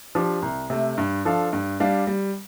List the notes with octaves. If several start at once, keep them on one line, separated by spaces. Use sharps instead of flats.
F3 D4 G4
C2
C3 A3
G2
F3 D4 A4 F5
G2
G3 D4 G4 F5
G3